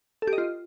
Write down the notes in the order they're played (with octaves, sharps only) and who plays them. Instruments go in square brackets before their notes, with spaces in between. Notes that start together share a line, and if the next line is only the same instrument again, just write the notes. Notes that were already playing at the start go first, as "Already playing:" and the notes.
[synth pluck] A4
G4
D#5
F4